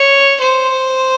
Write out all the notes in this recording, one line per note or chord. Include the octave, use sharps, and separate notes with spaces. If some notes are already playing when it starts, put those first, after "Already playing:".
Already playing: C#5
C5